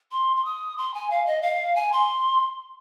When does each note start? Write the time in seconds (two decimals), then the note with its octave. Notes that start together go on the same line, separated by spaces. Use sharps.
0.12 C6
0.36 C6
0.45 D#6
0.78 C6
0.94 G#5
1.11 F5
1.26 D#5
1.42 F5
1.76 G#5
1.92 C6